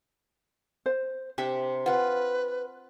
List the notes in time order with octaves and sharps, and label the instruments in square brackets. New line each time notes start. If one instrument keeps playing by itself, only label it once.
[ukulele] C5
[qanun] C3 D4 E5 [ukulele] G4
[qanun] C4 D4 F4 [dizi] B4 [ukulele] F#5